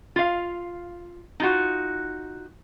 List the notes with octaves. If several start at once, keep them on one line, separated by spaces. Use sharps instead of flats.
F4 F5
D#4 F4 F#4